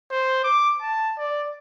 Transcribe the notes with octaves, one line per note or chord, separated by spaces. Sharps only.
C5
D6
A5
D5